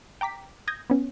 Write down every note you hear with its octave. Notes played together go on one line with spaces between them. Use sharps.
G5 A#5 D6 B6
D#6 G6 G#6 A#6
B3 C#4